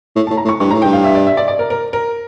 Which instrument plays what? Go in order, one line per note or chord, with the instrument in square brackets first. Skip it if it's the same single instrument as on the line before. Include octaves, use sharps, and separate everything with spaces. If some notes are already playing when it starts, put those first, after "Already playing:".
[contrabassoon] A2
[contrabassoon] A2 [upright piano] A5
[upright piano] A#5
[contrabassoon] A2
[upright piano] C#6
[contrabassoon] G2 [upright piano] C#6
[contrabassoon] A2 [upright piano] A#5
[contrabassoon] G2 [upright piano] G5
[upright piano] F5
E5
D5
E5
D5
D5
A#4
A#4
A#4